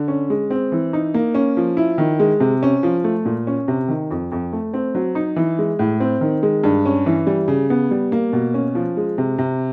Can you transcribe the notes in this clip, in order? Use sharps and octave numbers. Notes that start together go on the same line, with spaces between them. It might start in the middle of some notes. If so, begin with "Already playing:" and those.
Already playing: D3
C#4
G#3
C4
E3
D#4
A#3
C#4
F3
E4
D#3
G#3
C3
C#4
F3
A3
A#2
C#4
C3
D#3
F2
F2
A3
C4
F#3
D#4
E3
G#3
A2
C4
D#3
G#3
G2
C#4
E3
G3
C#3
B3
G3
A#3
B2
C#4
F3
G#3
C3
C3